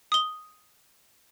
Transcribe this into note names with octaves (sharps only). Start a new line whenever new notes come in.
D#6 G7